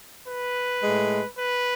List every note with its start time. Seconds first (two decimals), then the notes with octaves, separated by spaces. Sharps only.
0.26 B4
0.82 A2 G#3
1.37 B4